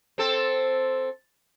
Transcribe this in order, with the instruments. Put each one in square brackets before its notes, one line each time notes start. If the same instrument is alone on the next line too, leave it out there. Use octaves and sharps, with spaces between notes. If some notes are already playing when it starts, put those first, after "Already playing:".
[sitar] C4 A4